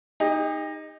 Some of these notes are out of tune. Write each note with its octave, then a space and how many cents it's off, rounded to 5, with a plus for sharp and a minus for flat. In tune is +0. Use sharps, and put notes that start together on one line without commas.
D#4 +0 G4 +45